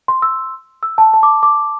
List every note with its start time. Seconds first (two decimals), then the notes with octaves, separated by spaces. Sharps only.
0.08 C6
0.22 E6
0.83 E6
0.98 A5
1.14 A5
1.23 D6
1.43 D6